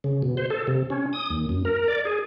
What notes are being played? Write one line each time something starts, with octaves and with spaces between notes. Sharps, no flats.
C#3
B2
C5
A4
C3
C#4
D#6
D#2
F#2
A#4
D5
G#4